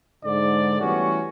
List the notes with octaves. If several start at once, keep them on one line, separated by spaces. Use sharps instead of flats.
G#2 D3 D5
E3 G3 A3 B3 C#4 F#4